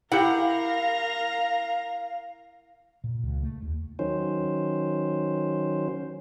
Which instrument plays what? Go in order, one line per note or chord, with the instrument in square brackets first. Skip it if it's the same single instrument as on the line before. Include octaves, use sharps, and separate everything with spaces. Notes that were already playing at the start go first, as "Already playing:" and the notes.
[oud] E4 [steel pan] G4 F#5 [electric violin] A#4 A#5 [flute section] F5
[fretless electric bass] A#2
C#2
A3
D#2
[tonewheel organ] D#3 F#3 C#4 C5